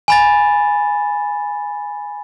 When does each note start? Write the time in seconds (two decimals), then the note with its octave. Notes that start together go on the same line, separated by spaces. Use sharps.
0.08 G#5 B5 A6